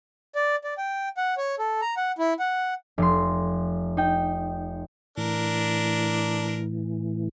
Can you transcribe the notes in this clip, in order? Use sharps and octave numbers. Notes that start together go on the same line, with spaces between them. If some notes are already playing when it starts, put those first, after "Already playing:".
D5
D5
G5
F#5
C#5
A4
A#5
F#5
E4
F#5
F1 C6
D#4 G5
A2 E3 D4 A#4